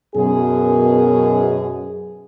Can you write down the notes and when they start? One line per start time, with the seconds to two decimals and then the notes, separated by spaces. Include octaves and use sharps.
0.15 F#2 B2 G#4